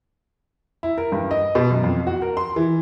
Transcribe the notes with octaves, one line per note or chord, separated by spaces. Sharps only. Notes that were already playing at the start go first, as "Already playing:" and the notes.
E4
A#4
G2
D#5
B2
F#2
F2
F#4
A#4
C6
E3